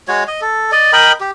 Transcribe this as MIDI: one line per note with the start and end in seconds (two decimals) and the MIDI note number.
0.08 0.24 56
0.08 0.24 66
0.08 0.24 73
0.27 0.41 75
0.41 0.71 69
0.72 0.92 74
0.72 0.92 75
0.93 1.12 70
0.93 1.12 75
0.93 1.12 79
0.93 1.12 83
1.20 1.31 67